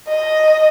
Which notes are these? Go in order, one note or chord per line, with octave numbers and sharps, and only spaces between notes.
D#5